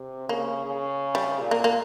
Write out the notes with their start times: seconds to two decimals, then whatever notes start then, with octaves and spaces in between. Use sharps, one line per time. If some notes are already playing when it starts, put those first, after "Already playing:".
Already playing: C3
0.29 C#3 A#3
0.65 C#3
1.15 G3
1.39 A#2
1.51 A#3
1.64 A#3